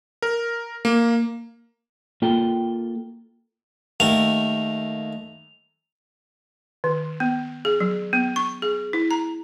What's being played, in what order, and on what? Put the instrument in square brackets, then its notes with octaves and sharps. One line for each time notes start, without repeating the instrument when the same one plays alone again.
[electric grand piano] A#4
A#3
[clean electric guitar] A#3 F4 A4 G5
[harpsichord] D#2 A3 A#4 [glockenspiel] F7
[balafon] D#3
B3
G#4
F#3
B3
C#6
G#4
E4
A#5